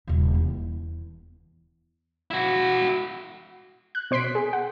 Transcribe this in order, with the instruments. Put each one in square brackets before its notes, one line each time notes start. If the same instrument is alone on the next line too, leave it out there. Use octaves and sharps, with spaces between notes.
[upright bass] D#1 C#3
E2
[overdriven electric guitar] E4 F#4
[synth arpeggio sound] F#6
B2 C5 C6 B6 D7
G#4
F#5